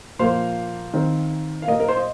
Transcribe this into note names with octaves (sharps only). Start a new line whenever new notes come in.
A#2 F3 A#3 C5 F5
D#3 C4
F5
A#2 A#3 A#4 D#5
A#4
C5
D#5